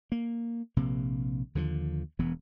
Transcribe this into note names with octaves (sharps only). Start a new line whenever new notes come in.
A#3
A#1 C3 A#3
D#2 D3 D#3 F3
E1 E3 B3